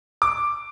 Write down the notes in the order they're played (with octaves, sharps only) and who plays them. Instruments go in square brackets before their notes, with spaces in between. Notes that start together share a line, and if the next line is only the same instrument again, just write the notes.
[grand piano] D6